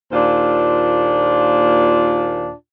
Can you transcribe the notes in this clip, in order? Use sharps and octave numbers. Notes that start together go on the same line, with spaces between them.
D#2 A#2 D4 F4 C5